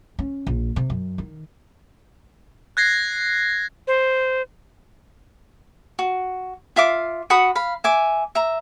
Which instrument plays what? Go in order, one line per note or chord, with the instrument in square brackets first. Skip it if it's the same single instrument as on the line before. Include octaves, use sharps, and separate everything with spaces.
[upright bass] C#4
A#1
C3
F#2
D#3
[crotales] F#6 G#6 A#6 C7
[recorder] C5
[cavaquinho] F#4
F4 E5 F5 D6
F#4 F#5 B5 D#6
F5 B5
E5 G#5 D6
E5 A#5